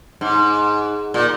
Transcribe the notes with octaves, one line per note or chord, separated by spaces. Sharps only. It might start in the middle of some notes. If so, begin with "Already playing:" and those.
G#2
A#2